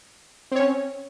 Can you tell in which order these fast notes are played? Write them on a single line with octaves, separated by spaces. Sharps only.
C4 C#5 C#4